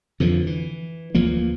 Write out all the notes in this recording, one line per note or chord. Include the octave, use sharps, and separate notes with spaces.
F2 D3 E3 F3
E3
D2 E3 F3 A#3